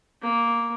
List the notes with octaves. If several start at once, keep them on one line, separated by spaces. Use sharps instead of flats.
A#3